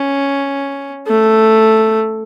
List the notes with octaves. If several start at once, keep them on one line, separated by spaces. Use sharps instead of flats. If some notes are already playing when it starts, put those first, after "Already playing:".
Already playing: C#4
A3